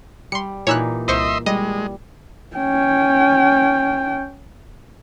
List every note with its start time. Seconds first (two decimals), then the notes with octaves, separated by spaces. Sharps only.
0.32 G3 C6 C#7
0.67 A#2 E3 D#4 C#5 E6 F#6
1.08 C2 C5 D#5 E5 C6 C#6
1.46 G3 G#3 D#5
2.56 C#4 G5